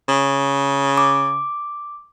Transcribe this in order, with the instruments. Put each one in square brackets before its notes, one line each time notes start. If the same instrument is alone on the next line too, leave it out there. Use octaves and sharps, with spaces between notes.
[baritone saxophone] C#3
[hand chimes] D6